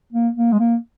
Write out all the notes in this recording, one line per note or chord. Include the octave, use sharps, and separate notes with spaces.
A#3
A#3
G#3
A#3